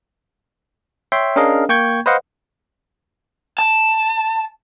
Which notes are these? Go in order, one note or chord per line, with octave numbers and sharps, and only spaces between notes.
C#5 E5 G5 C6
C#4 D4 G#4 A#4 D#5 F5
A#3 G5 C#6 G6 G#6
B4 C5 D#5 F5 F#5
A5